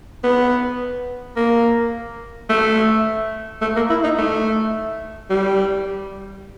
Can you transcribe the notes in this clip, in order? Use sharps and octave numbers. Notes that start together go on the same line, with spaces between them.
B3
A#3
A3
A3
A#3
E4
D#4
A3
G3